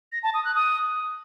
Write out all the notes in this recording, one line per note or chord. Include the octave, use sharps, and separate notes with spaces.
A#6
A5
D#6
F#6
D#6